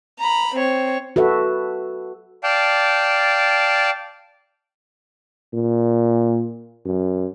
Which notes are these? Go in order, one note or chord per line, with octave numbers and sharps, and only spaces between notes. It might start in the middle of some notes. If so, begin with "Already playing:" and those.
A#5 B5
C4 C#5
F#4 A4 B4 E5
D5 F5 G5 A5
A#2
F#2